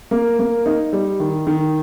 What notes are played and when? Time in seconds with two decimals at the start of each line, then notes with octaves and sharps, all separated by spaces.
0.11 A#3
0.39 A#3
0.66 D#4
0.93 G3
1.20 D#3
1.47 D#3